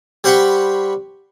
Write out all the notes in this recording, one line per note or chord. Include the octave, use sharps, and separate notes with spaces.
G3 C5 F#5 G5 B5 C#6